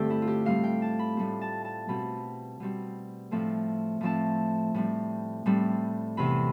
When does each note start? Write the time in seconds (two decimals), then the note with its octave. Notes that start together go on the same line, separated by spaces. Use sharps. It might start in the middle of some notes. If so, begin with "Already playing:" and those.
Already playing: G2 D3 A3 C4 G4 A4
0.10 E4
0.22 F4
0.27 G4
0.45 A2 G3 C4 F5
0.64 G5
0.82 A5
0.99 B5
1.17 A2 G3 C4
1.41 A5
1.65 A5
1.88 B2 G3 C4 B5
2.60 B2 G3 C4
3.31 A2 F3 A3 C4
4.01 A2 F3 A3 C4 A5
4.74 A2 G3 C4
5.46 A2 G3 C4
6.17 E2 C3 E3 B5